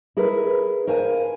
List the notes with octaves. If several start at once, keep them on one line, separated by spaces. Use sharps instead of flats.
E4 G#4 A#4 B4
A#4 C5 F5 G#5